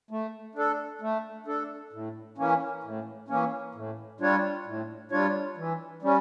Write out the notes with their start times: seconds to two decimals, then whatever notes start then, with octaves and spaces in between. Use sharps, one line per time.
0.11 A3
0.55 D4 A4
1.02 A3
1.46 D4 A4
1.93 A2
2.38 E3 A#3 C#4
2.84 A2
3.28 E3 A#3 C#4
3.75 A2
4.20 G3 D4 F4 C#5
4.66 A2
5.11 G3 D4 F4 C#5
5.57 E3
6.02 G3 C#4